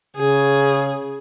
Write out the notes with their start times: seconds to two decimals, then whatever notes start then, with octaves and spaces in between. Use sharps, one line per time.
0.16 C#3 G#4